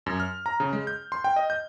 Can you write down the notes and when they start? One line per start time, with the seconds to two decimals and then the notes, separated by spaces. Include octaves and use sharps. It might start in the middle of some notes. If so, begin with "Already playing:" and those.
0.06 F#2
0.20 F6
0.46 A#5
0.60 C#3
0.73 G#3
0.87 G6
1.12 C6
1.24 G5
1.36 D#5
1.50 G6